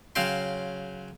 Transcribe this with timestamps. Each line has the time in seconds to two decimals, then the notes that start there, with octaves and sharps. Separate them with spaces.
0.16 C#3 F#3 F5 G5 C6